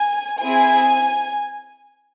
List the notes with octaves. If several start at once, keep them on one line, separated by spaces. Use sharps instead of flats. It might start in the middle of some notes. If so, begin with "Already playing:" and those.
Already playing: G#5
C4 E4 G#4 G#5